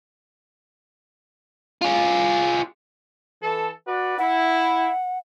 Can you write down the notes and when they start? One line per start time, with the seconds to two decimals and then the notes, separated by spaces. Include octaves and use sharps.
1.82 F4 G#4
3.42 E3 A4
3.87 F#4 B4 D5
4.18 E4 F#5